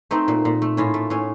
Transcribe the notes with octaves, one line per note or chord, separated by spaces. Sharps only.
A3 C4 D#4
A#2
A#2
A3
A2 C#4 F4
A3
A2 C#4